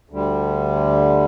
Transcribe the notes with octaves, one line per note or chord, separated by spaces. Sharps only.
D2 D3 G3